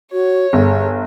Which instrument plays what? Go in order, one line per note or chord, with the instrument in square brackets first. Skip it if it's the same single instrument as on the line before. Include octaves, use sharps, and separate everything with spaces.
[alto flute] F#4 [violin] C#5
[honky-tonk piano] G1 [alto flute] G#4